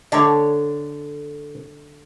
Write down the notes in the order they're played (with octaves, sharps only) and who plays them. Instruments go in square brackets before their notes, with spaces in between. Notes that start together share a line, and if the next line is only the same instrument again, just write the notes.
[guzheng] D3 C#5 [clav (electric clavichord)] A4 D5